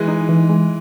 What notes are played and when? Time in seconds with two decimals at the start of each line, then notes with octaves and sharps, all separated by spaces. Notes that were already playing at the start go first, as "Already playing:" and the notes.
Already playing: E3 G#3
0.08 D#4
0.29 E3
0.50 G#3